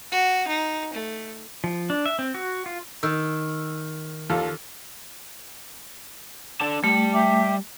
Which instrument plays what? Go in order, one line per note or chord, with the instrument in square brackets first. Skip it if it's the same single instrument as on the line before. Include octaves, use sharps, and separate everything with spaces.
[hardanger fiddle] F#4
D#4
A3
[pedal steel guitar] F3
D4
E5
C4
F#4
F4
[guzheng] D#3 [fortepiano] E6
[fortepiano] D#2 F4 A4
[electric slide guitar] D4 A4 A5
[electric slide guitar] G3 [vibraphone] A3
[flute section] E5 G5 D6